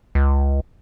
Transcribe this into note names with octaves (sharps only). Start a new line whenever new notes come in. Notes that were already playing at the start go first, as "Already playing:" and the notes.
C#2